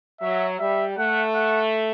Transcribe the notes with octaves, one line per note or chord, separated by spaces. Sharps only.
F#3 E5
G3 E5
A3 F#5
F#5